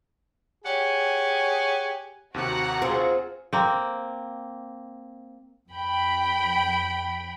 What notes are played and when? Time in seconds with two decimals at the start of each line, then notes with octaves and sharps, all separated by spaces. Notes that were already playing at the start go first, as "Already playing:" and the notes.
0.65 G4 G#4 C#5 F#5 G#5
2.34 D#2 C3 F#4 F#5 A#5 F#6
2.82 C4 F4 G#4
3.53 A#3 C4
5.70 F2 G5 B5